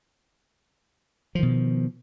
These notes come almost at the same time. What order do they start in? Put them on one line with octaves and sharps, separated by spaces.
F3 D#3 B2